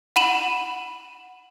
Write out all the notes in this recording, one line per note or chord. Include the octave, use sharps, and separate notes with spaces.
F#5 B5 D#7 E7 F#7